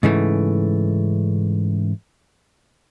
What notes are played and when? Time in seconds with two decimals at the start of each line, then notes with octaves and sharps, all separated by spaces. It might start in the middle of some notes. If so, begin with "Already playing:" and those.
0.03 G#2 C#3 E3 A3